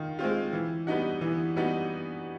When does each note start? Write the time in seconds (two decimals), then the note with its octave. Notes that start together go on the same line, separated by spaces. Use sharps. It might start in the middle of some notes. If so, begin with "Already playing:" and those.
Already playing: D#3 F4
0.19 G#3 C4 F4
0.53 E3
0.87 G3 B3 D#4 F#4
1.21 E3
1.56 G3 B3 D#4 F#4